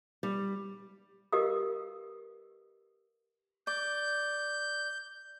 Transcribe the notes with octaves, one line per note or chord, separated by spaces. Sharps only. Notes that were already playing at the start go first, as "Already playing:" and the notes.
G3
G4 A#4 B4 D#5 F5 D#6
D5 G6